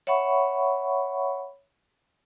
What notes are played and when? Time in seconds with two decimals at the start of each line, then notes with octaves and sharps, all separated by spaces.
0.07 C#5 E5 F#5 B5 C#6